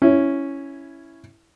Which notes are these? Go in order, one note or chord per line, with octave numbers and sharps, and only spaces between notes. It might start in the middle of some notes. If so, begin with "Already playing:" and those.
C#4 E4